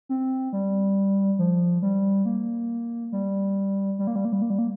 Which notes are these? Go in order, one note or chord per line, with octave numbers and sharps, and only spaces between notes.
C4
G3
F3
G3
A#3
G3
G3
A#3
G3
A#3
G3
A#3
G3
A#3